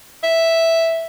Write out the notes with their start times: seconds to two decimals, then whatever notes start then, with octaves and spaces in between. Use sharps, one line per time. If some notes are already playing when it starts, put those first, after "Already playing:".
0.23 E5